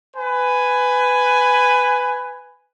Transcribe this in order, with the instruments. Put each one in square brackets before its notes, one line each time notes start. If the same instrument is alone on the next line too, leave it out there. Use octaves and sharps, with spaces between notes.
[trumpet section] B4 G#5